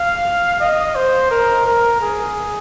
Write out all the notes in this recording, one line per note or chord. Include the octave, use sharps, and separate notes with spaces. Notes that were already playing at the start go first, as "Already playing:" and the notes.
Already playing: F5
D#5
C5
A#4
A#4
G#4